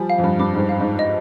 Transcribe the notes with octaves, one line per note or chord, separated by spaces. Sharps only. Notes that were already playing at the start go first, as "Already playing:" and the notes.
Already playing: F3 G3 G#5
F5
F2
G2
G2 D6
G#2
G2
F5
G#2
D#5